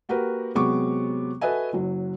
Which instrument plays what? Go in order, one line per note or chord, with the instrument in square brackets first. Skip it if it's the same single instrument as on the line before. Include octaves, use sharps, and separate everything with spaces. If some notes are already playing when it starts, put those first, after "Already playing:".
[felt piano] A#3 F#4 G4 A#4 B4
C3 F#3 G#3 B3 C#6 D6
F#4 A4 B4 D#5 E5 G#5
F#1 F#3